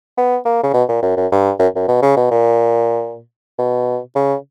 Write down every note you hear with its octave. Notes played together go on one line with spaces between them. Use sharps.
B3
A#3
C#3
B2
A#2
F#2
F#2
G2
F#2
F#2
B2
C#3
B2
A#2
B2
C#3